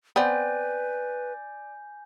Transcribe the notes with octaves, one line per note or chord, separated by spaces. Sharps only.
B3 C4 B4 D5 G#5 G6